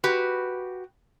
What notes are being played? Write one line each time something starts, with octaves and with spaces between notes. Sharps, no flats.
F#4 G4 B4